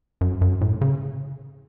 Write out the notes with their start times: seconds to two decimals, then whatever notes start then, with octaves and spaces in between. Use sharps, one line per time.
0.21 F#2
0.41 F#2
0.61 A2
0.81 C#3